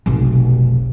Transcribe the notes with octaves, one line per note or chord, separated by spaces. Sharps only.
F1 B1